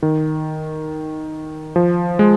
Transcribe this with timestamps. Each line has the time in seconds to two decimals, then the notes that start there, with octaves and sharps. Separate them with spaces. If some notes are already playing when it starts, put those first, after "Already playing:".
0.03 D#3
1.76 F3
2.19 G#3